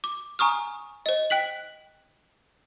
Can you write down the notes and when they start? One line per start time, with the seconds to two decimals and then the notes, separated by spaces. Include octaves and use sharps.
0.04 D6
0.39 G#5 A#5 C#6 D#6 F6
1.06 C5 D#5
1.30 G5 F#6 B6 F#7